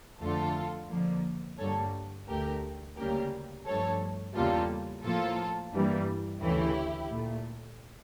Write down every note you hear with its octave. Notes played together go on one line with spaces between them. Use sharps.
F2 D3 A3 F4 A4
F2 D3 F3 A#3
G2 D3 G3 A#3 A4 C#5
D2 D3 A3 G4 A#4
D2 C#3 G3 A#3 G4 A#4
G2 F3 A3 A4 C#5
E2 C#3 G3 A#3 F4 A4
A2 F3 A#3 F4 A4
G2 E3 G3 A#3
D2 C#3 E3 A3 E4 G4
A#2 A3